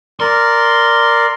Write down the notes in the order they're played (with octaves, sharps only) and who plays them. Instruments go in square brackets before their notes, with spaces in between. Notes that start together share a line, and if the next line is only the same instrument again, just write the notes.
[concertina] A#4 D5 [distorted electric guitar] C6